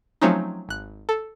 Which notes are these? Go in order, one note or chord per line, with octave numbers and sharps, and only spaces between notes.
F3 F#3 A3 C4 C#4 D#4
G#1 F#6
A4